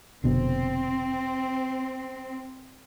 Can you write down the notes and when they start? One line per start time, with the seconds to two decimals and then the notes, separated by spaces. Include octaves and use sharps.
0.24 F1 B2 D3 C4